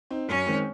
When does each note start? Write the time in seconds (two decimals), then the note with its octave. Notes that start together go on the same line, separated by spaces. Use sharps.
0.10 C4 D#4
0.28 F#2 C#4
0.47 D#3 G#3 C4